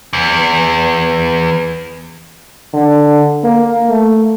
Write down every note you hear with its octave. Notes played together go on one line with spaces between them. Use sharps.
E2
D3
A#3
A3